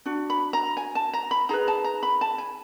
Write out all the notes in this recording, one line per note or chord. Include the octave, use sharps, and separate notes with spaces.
D4 F#4
B5
A#5
G#5
A5
A#5
B5
D#4 G#4 B4 A#5
A5
A#5
B5
A5
G#5